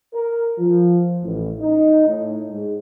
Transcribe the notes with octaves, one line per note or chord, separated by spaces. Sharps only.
A#4
F3
A1
D#4
A2
G#2